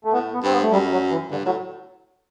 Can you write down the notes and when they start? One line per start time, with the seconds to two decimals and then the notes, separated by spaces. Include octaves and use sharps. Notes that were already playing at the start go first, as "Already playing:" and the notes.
0.05 A3
0.13 A2 B3
0.34 B3
0.43 G2 C4
0.53 B3
0.63 A3
0.72 F#2 G3
0.92 F#3
1.11 E3
1.31 G2 D3
1.46 A2 F#3